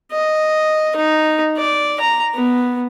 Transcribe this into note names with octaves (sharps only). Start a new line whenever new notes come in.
D#5
D#4
D5
A#5
B3